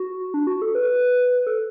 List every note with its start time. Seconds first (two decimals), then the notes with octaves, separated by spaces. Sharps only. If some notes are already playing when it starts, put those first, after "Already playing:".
Already playing: F#4
0.34 D4
0.47 F#4
0.62 A4
0.75 B4
1.47 A4